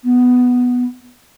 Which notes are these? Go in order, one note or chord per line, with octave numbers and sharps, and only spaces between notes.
B3